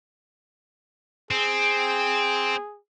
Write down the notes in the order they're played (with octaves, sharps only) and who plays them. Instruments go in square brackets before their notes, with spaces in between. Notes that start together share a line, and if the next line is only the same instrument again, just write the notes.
[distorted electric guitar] C4 [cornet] G#4